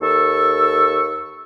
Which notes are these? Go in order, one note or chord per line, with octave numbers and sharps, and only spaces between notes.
D#2 A4 C#6 E6